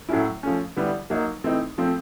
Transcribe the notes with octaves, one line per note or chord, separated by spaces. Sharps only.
A2 F#3 A3 C#4 E4
F3 A3 C#4
D3 G3 B3 E4
F#3 A#3 D#4
E3 A3 C4 D#4
F3 A3 C4